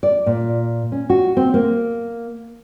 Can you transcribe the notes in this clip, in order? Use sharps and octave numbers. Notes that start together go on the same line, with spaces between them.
D5
A#2
C#4
F#4
C4
A#3